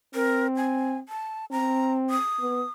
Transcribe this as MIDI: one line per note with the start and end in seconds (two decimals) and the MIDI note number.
0.15 1.01 60
0.15 0.47 70
0.56 0.97 80
1.09 1.45 81
1.51 2.17 60
1.51 1.93 82
2.10 2.71 87
2.41 2.63 59